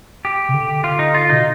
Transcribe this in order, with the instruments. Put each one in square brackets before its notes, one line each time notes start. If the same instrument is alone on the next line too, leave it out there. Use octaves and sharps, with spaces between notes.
[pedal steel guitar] G4
[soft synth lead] C3
D3
[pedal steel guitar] F4
D#4
F4
[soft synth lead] B2 [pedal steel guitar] D#4